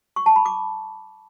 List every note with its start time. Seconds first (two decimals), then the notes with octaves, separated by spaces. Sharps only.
0.16 C#6
0.26 A5
0.36 B5
0.46 D6